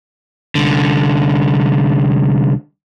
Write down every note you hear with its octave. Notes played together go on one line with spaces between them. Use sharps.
C2 D3